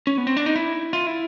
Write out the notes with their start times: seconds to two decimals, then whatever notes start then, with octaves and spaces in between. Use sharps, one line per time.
0.07 C#4
0.18 B3
0.27 C4
0.37 D4
0.46 D#4
0.56 E4
0.93 F4
1.07 E4